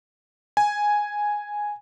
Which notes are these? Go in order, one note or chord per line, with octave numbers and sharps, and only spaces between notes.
G#5